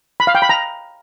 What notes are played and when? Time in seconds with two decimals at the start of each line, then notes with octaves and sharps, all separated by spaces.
0.20 B5
0.27 F5
0.35 G5
0.42 B5
0.49 A#5